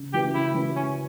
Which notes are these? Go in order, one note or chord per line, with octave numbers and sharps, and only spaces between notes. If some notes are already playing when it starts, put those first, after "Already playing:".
Already playing: C#3
F#3 C#4 E4 G4 B4
C#3 E4
F#3 C#4 E4 B4
C#3 C#4